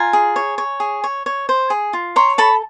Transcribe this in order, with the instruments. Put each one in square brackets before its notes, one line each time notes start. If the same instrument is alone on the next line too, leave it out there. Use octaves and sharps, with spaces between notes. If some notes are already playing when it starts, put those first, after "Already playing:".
Already playing: [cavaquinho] F4 G#5 A#5
G#4
C#5
C#5
G#4
C#5
C#5
C5
G#4
F4
C#5 A#5 C6
A4 A5 B5